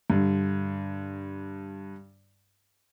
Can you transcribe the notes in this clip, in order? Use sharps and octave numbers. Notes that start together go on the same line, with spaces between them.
G2 D3